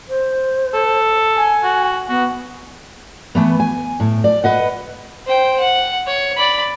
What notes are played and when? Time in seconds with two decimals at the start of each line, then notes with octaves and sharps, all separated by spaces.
0.09 C5
0.74 A4
1.37 G#5
1.64 F#4
2.09 B3 F#4
3.35 E3 A3 B3
3.60 G#5
4.00 A2
4.24 D5
4.44 B4 D#5 F#5
5.26 C5 G5
5.60 F#5
6.06 C#5
6.37 D5 B5